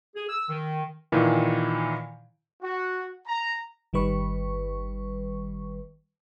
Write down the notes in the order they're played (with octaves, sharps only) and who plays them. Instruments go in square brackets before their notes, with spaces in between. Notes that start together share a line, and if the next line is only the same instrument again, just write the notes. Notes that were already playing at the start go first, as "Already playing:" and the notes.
[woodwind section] G#4
E6
D#3
[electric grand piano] A#2 D#3 E3 E4
[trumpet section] F#4
A#5
[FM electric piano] G1 D#3 G3 B4 C#6